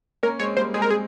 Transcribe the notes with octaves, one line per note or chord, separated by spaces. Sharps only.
A#3 C#4 A#4
G#3 C4 C#5
G3 A#3 C5
G#3 C4 G#4
A#4
G#4